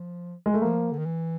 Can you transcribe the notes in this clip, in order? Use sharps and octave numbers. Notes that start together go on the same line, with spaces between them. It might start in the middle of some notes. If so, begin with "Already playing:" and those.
Already playing: F3
G#3
A3
F3 A#3
D3
D#3
E3